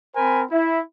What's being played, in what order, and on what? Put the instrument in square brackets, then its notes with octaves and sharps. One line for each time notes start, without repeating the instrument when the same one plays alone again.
[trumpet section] C4 A#4 C5 G#5 B5
E4